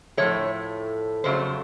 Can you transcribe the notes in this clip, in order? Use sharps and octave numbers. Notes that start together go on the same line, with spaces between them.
A2 F3 A3 C#5
F2 C#3 F#3 A3 C5